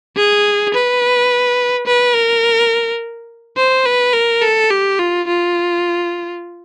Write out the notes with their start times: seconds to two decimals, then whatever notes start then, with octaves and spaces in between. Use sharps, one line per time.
0.16 G#4
0.74 B4
1.87 B4
2.15 A#4
3.57 C5
3.85 B4
4.13 A#4
4.42 A4
4.70 G4
4.99 F4
5.27 F4